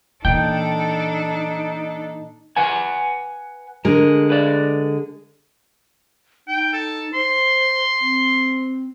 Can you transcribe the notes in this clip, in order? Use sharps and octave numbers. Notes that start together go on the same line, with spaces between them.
A#2 E3 D4 D#4 A4 G5
B4 F#5 G#5
D3 G#3 A#4
B4 D5
D#4 G5
A4
C5 C6
C4